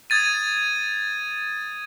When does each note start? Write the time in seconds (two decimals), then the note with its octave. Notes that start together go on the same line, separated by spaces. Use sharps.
0.10 D#6 G#6 A6 D#7